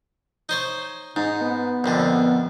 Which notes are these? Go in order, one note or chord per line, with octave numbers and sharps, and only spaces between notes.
D#4 C5 C#5
G#2 D#4
B3
A#1 F2 D3